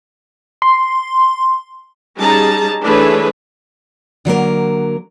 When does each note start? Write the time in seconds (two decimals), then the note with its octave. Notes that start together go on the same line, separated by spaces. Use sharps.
0.62 C6
2.19 G3 C#4 D#4 G#4 A5 A#5
2.84 E3 A3 D4 G#4 B4 C#5
4.25 D3 F#3 A#3 A#4